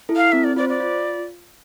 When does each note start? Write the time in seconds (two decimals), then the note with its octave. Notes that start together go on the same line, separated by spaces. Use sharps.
0.09 E4 A4
0.16 F5
0.32 C4 E5
0.44 D5
0.56 F4 C5 D5
0.69 D5
0.80 F4